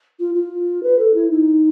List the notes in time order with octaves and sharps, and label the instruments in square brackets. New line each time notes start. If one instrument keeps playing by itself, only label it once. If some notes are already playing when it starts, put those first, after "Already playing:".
[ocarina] F4
F4
B4
A4
E4
D#4